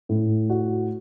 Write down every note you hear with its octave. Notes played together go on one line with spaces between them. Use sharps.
A2
F#4